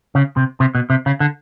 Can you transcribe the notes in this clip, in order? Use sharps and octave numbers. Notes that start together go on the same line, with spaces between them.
C#3
C3
C3
B2
C3
C#3
D3